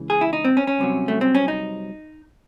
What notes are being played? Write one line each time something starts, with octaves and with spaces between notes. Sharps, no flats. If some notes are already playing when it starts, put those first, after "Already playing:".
Already playing: C#2 C#3 E3
G#4
E4
D#4
C4
C#4
C#4
C2 C3 F#3
A3
C4
C#4
D#4